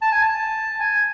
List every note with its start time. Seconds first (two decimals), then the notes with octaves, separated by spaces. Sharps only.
0.02 A5
0.12 G#5
0.22 A5
0.80 G#5